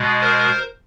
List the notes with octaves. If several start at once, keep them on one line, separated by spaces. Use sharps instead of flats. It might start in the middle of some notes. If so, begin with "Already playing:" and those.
Already playing: B2 G#3
A#4 C5